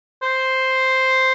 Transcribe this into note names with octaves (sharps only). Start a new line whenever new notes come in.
C5